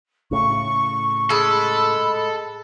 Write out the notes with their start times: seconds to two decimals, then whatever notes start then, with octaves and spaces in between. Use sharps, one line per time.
0.31 A2 C#3 C#6
1.30 G#3 A4 B5